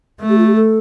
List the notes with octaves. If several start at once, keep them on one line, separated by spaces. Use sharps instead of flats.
A3
G4
F4
G4
A4